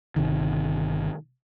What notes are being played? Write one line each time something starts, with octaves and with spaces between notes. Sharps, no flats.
G1 C3 D#3